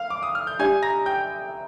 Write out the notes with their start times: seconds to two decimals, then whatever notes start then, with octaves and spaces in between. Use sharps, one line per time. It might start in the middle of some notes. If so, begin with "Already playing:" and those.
Already playing: F5 F6
0.10 D6
0.23 D#6
0.35 F6
0.47 G6
0.59 D4 G4 D5 G#5 G#6
0.82 A#5 A#6
1.06 G5 G6